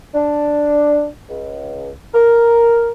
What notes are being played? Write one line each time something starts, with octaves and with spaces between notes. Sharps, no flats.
D4
C#2
A#4